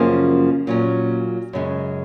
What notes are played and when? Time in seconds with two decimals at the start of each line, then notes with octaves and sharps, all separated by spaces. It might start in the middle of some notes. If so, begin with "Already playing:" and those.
Already playing: F#2 C#3 F3 A#3 C#4
0.67 A#2 F#3 C#4
1.53 F#2 C#3 G#3